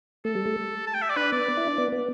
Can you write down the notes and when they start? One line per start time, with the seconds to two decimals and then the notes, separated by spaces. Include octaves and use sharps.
0.25 A3 A4
0.35 G3
0.45 A3
0.87 A5
0.94 G5
1.02 E5
1.09 D5
1.16 D4 B4
1.32 B3 D5
1.57 E4
1.67 D4
1.78 B3
1.92 B3